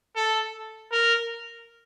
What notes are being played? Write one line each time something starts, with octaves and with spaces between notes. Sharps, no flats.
A4
A#4